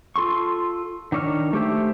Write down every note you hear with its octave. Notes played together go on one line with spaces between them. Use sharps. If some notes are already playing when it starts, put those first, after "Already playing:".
F4 A4 C6 C#6
D#3 D4 C#5 D#5 F6
A3 G4 C5 E5